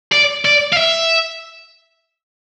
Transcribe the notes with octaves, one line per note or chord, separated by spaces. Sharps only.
D5
D5
F5
E5